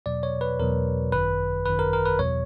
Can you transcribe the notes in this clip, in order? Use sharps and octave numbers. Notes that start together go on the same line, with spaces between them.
E2 B2 F#3 D5
C#5
B4
E2 B2 F#3 A#4
G#1 F#2 D#3 B4
G#1 F#2 D#3 B4
A#4
A#4
B4
E2 B2 F#3 C#5